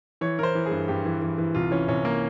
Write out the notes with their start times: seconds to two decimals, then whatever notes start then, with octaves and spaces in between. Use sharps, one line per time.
0.21 E3 C#5
0.39 E3 A#4 C5
0.55 E3
0.66 G#4
0.71 G2
0.88 G2 G4
1.05 E3
1.22 E3
1.38 E3
1.55 C2 F4
1.71 E3 C#4
1.88 C2 C#4
2.05 A#3